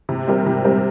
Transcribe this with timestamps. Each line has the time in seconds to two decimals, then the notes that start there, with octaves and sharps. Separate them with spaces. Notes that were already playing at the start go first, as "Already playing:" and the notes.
0.09 C3
0.27 G3 C4 G4 A#4
0.46 C3
0.65 G3 C4 G4 A#4